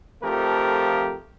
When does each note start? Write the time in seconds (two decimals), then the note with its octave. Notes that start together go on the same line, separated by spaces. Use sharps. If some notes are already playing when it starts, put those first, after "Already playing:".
0.23 F2 F3 A3 G4 A#4